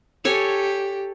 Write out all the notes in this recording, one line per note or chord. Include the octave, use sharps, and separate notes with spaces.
G4 A4 C#5 G#5